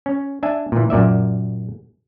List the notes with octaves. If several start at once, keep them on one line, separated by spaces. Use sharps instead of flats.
C#4
D4 E5 G#5
A#2 E3
F#2 A#2 D5 E5